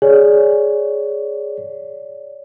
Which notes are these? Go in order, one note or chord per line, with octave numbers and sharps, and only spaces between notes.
G#4 C#5 D5